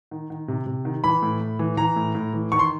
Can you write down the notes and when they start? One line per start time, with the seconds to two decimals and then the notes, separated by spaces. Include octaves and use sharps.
0.11 D#3
0.30 D#3
0.48 C3
0.67 C3
0.85 D#3
1.04 E3 B5
1.22 A2
1.41 A2
1.59 E3
1.77 E3 A#5
1.96 A2
2.15 A2
2.33 E3
2.52 D#3 C#6
2.59 C6